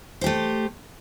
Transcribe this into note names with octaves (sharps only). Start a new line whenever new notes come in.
A3 G4 C5